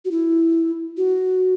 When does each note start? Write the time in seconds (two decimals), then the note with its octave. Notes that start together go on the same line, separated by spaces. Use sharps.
0.05 F#4
0.11 E4
0.97 F#4